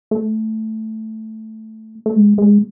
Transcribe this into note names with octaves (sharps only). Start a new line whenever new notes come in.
A3
A3
G#3
G#3